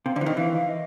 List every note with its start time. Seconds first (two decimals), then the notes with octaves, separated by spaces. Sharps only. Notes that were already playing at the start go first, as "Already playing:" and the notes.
0.06 C3 F5
0.16 D3 C5
0.21 E3
0.26 D#3 D#5
0.37 E3 F5
0.52 F5
0.69 D#5